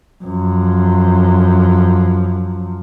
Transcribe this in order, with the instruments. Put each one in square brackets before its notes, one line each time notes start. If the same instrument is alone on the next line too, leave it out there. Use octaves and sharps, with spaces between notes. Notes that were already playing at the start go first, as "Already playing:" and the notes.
[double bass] F#2 F3